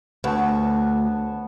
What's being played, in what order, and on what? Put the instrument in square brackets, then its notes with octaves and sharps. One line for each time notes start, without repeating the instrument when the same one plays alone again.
[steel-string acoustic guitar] D2 [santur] B3 C#5 A5